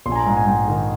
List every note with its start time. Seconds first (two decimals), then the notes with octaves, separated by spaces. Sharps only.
0.06 A#1 C6
0.12 G#5
0.16 A#5
0.26 G#2 A#5
0.37 G#5
0.47 G#2 G5
0.68 D#3